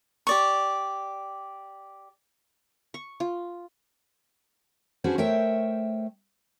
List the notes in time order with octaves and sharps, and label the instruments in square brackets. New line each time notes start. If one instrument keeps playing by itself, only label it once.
[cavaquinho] G4 D5 C#6
[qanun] C#6
F4
[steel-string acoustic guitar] C#4 D4 F#4 G#4 B4 C5
A3 A#4 C5 C#5 E5 G5